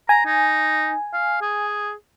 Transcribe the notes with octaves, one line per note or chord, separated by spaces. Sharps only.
G#5 A#5
D#4
F5
G#4